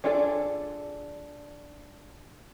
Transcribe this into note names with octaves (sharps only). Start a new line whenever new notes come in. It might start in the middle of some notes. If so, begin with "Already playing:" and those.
D4 F4 G#4 A4 D5